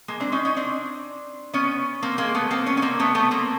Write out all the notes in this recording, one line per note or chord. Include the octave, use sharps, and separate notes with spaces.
G#3 A#3
C4 D4
C#4 D#4
C#4 D#4
C4 D4
B3 C#4
A#3 C4
G#3 A#3
A3 B3
A#3 C4
B3 C#4
C#4
A#3 C4
A3 B3
A3 B3
A#3 C4